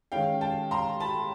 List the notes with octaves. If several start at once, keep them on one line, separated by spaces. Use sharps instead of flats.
D#3 G#3 C#4 F5 G5
G5 A5
A#5 C6
A5 B5